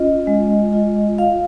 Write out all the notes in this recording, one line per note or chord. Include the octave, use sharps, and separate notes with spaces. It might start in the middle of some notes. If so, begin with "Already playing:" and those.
Already playing: C#4 F4 D#5
G#3
F4
F4 F5